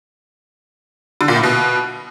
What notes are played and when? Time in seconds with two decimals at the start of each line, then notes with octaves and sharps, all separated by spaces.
1.21 D3
1.28 A#2
1.36 A2
1.43 B2